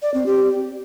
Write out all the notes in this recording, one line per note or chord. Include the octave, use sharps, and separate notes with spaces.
D5
C4
G4